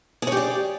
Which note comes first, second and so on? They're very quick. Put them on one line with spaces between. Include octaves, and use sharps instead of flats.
G#4 C#5 G4 D5